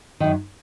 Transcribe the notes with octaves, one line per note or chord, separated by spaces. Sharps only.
F#2 D#3